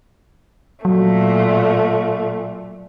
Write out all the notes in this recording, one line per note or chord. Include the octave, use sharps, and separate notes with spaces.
A#2 F#3 A3